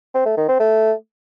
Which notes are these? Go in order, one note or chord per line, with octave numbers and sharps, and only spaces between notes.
C4
A3
D#3
C4
A3